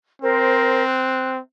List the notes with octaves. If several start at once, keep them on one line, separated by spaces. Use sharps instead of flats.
C4 A#4 C5
F#6